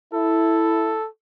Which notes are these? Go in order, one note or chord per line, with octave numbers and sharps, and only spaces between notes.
E4 A4